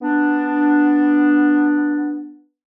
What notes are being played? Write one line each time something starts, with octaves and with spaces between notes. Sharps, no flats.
B3 D4